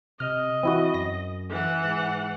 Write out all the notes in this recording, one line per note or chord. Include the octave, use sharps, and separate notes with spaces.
C3 D#5 F6
E3 C4 E4 F#4
F#2 A#6
E3 F#5
G#2